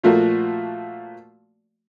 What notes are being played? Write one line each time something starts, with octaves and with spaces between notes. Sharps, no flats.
A#2 F3 A3 A#3 F4 F#4